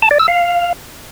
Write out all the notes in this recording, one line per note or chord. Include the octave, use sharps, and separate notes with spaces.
A5
D5
E6
F5